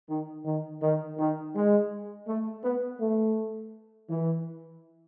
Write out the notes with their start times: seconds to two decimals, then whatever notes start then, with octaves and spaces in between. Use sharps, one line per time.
0.09 D#3
0.45 D#3
0.82 D#3
1.18 D#3
1.55 G#3
2.27 A3
2.64 B3
3.01 A3
4.09 E3